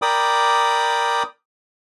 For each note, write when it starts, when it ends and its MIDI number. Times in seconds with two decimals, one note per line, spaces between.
0.02 1.23 70
0.02 1.23 74
0.02 1.23 79
0.02 1.23 83
0.02 1.23 86
0.02 1.23 87